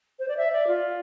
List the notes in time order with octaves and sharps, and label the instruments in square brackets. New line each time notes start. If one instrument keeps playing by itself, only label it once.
[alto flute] C5
D5
E5
D5
F4